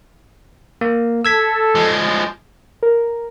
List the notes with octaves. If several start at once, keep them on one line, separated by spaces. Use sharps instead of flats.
A#3
A4 E6 G#6 B6
F3 G#3
A#4